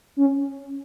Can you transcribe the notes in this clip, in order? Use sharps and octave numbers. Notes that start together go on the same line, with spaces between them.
C#4